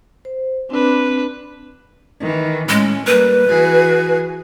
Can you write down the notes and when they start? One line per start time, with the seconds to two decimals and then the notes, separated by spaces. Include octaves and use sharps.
0.25 C5
0.70 C4 D4 B4
2.21 D#3 E3
2.69 A2 G#3 C#4
3.07 G3 A#3 B4
3.46 E3 F#4 G#4